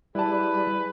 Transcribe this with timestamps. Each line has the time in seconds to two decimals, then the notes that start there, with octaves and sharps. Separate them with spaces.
0.15 G3 E4 G#4 B4 A5